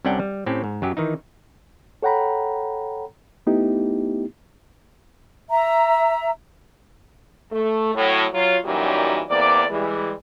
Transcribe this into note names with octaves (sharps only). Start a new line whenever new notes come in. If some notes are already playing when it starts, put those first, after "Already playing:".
C2 C3 C#4 D4 F#5 G5
G3
A2 C4 C#4 G4
G#2
F#2 F#3 G4
D#3 E3 D#4
A4 C#5 F#5 G5 A#5 B5
A3 B3 D#4 E4 G4
E5 A#5
A3
A2 F#3
F#3 F4 C#5
F#2 A#2 E3 F#3 G3 D#4
E2 A#3 C4 D5
E3 G3 G#3